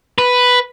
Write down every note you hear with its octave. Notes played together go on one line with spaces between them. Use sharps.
B4